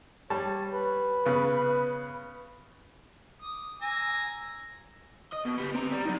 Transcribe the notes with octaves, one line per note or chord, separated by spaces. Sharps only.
G3 C#5 A5
B4
C#3 B3
D6 D#6
G#5 A#5 E6
D#5
B2
B3 G4
C4 A#5
G3
F#3 D#4